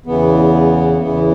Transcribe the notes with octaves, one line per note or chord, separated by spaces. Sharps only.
E2 C#3 E3 B3
E2 C#3 E3 B3